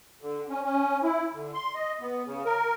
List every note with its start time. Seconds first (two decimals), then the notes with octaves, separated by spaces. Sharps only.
0.22 D3
0.49 C#4
0.64 C#4
1.03 E4
1.34 D3
1.54 C6
1.75 D#5
2.01 B3
2.26 C#3
2.45 A#4